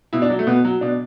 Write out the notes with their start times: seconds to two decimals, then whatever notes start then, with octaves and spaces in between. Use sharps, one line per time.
0.13 B2 E4
0.22 D4
0.30 F#3
0.39 A3
0.47 B2 B3
0.65 F#3
0.81 B2 D4